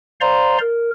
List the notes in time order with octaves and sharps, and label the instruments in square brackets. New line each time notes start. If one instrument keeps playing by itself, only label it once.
[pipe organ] C5 D5 F5 A#5 C6
A#4